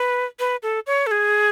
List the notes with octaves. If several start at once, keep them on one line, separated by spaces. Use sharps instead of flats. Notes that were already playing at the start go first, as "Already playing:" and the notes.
Already playing: B4
B4
A4
C#5
A4
G#4